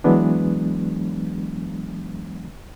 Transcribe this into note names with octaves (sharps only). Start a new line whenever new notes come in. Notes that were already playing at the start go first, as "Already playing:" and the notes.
E3 F#3 G#3 B3 D4